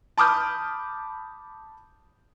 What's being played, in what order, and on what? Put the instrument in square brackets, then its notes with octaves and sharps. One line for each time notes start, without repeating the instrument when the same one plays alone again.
[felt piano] A5 B5 D6 D#6 F6 G6